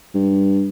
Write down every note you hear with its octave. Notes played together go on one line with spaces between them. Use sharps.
G2